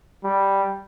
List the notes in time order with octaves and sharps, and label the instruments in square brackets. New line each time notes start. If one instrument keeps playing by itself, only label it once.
[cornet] G3